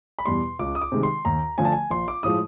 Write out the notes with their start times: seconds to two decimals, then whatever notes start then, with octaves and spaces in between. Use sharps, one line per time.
0.19 B5
0.26 E2 B2 G3 C6
0.59 C#2 D6
0.75 D#6
0.82 D6
0.92 C3 D#3 G#3
1.03 C6
1.25 D#2 A#5
1.58 D3 F3 A3 G#5
1.65 A5
1.72 G#5
1.91 A#1 C6
2.08 D6
2.23 A2 F3 G#3 D#6